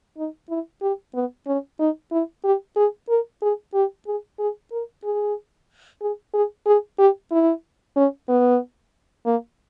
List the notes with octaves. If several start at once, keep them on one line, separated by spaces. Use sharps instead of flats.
D#4
E4
G4
B3
C#4
D#4
E4
G4
G#4
A#4
G#4
G4
G#4
G#4
A#4
G#4
G#4
G#4
G#4
G4
E4
C#4
B3
A#3